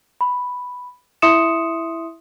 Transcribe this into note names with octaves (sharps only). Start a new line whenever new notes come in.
B5
E4 E5 C6 D#6 C#7 E7